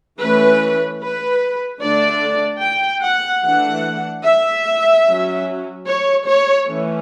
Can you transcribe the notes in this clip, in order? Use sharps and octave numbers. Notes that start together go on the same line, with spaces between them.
E3 A3 C#4 B4
B4
D3 A3 D4 D5
G5
F#5
E3 A3 D4 F#5
E5
F#3 C#4
C#5
C#5
E3 A3 C#4